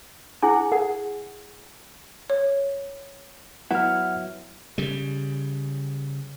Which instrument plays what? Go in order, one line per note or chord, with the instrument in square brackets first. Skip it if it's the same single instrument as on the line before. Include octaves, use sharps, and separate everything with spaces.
[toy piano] E4 G#4 G#5 [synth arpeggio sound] F#5
[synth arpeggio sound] G#4 [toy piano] F#5
[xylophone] C#5
[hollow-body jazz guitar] F#3 B3 E4 [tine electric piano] F#5 F6
[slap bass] C#3 G3